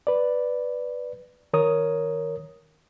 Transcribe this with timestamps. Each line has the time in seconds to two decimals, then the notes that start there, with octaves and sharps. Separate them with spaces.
0.07 B4 D5
1.53 D#3 A#4 C#5 D#6